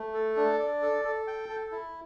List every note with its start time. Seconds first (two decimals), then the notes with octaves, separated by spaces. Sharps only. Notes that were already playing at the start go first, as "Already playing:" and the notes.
Already playing: A3
0.14 A4
0.36 D4
0.59 D5
0.82 A4
1.05 A4
1.27 G5
1.49 A4
1.72 E4